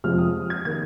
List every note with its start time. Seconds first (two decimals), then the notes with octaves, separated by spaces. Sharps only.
0.04 F2 C3 F3 G#3 F6
0.18 D#6
0.50 G#6
0.65 D#3 A#3 G#6